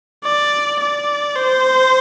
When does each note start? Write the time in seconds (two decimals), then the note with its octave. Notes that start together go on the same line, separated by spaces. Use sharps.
0.24 D5
0.80 D5
1.36 C5